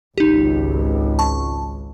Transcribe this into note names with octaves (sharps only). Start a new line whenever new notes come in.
G#1 C#2 D#4 G4
A5 C#6